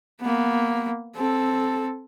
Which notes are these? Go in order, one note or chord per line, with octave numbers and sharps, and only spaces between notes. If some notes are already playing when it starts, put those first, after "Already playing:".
A#3 B3
C4 A4